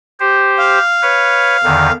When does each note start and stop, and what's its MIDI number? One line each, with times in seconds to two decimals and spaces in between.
0.20 0.79 67
0.20 0.79 72
0.58 1.92 77
1.02 1.57 71
1.02 1.57 73
1.64 1.90 40
1.64 1.90 50
1.64 1.90 51